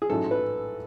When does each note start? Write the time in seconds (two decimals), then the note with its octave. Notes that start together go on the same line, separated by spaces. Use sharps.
0.02 G#4
0.09 A1 G#2 F#3 A4
0.31 B4